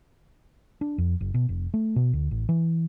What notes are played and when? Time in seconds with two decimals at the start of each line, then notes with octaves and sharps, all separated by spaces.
0.81 D4
0.98 F2
1.20 F#1
1.34 B2
1.49 F1
1.74 A3
1.96 B2
2.13 D2
2.31 A1
2.49 E3